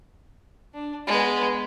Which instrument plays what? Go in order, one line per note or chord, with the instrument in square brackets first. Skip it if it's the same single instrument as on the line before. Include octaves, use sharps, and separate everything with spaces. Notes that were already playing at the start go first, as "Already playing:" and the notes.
[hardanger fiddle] D4
G#3 B3